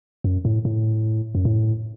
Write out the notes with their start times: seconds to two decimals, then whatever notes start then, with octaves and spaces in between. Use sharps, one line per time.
0.24 F#2
0.45 A2
0.65 A2
1.35 F#2
1.45 A2